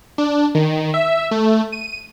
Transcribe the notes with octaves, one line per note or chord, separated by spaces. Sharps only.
D4
D#3
E5
A3
D#7